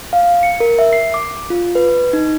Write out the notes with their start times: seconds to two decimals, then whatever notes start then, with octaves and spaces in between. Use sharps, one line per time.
0.13 F5
0.43 C#7
0.60 A#4
0.79 E5
0.93 C7
1.14 D6
1.50 F4
1.75 B4
2.13 D#4